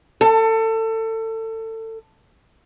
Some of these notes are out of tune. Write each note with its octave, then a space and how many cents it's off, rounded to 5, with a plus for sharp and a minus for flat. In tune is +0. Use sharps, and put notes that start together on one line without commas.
A4 +25